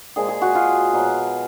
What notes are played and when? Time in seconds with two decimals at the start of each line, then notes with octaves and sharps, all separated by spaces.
0.16 A#2 F3 G#3 G#4
0.29 G#4
0.42 F#4
0.55 F4
0.94 B2 F#3